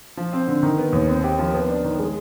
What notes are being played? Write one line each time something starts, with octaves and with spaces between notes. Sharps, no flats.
F3
C4
D3
D#3
B3
D#2
C4
G4
F3
B3
D4
D#3
G#3